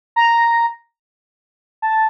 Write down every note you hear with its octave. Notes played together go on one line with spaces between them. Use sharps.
A#5
A5